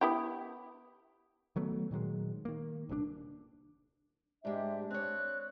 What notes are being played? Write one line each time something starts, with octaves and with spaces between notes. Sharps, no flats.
B3 E4 G4
D#3 F#3 A3 B3
A#2 D#3 F#3 G#3
D#3 A#3
D#1 C2 D3 D4
G#2 G#3 D4 G4 E5
C4 C#5 F#6